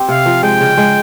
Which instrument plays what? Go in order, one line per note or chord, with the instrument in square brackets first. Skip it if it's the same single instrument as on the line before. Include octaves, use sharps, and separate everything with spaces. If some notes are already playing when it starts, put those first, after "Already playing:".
Already playing: [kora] C4 G4
[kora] C3 [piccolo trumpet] F5
[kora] F3
[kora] G#3 [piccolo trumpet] G5
[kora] C#3
G#3